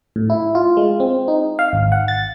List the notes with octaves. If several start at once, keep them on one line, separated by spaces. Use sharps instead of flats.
A2
E4
F4
G#3
C4
D#4
F5
G#1
F#5
A6